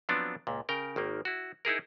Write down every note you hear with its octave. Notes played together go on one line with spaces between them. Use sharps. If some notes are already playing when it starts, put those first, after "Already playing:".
F3 F#3 B3 C4 D4 F4
C#2 A#2
C#3 A#4 G5
G#1 D#3 A#3
E4 F#4
D#4 E4 G#4 A#4